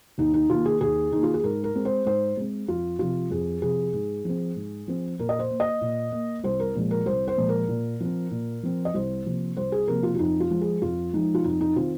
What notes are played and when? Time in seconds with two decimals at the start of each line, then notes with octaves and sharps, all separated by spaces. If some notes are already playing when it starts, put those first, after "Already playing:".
0.18 D#2 D#4
0.34 D#4
0.50 D#3 A#3 F4
0.65 G#4
0.81 D#2 G#4
1.12 D#3 A#3 D#4
1.23 F4
1.34 G#4
1.44 G#2 A#4
1.64 A#4
1.75 G#3 C4
1.85 C5
2.06 G#2 C5
2.37 G#3 C4
2.68 F2 F4
2.99 C3 F3 F4
3.31 F2 G#4
3.62 C3 F3 G#4
3.94 G#2
4.25 F3 C4
4.56 G#2
4.88 F3 C4
5.19 A#2 A#4
5.29 D#5
5.39 C5
5.51 A#3
5.60 D#5
5.81 A#2
6.12 A#3
6.44 C2 C5
6.60 A#4
6.75 A#2 F3 G#3
6.91 A#4
7.06 C2 C5
7.27 C5
7.37 A#2 F3 G#3
7.49 A#4
7.68 A#2
8.00 F3 C4
8.31 A#2
8.63 F3 C4
8.85 D#5
8.94 C2 C5
9.26 C3 F3 A#3
9.57 C2 C5
9.72 G#4
9.88 C3 F3 A#3 A#4
10.03 F4
10.15 F4
10.19 F2 D#4
10.40 F4
10.51 F3 G#3
10.61 G#4
10.82 F2 F4
11.13 F3 G#3 D#4
11.35 F4
11.44 F2 D#4
11.61 D#4
11.76 D#3 C4 F4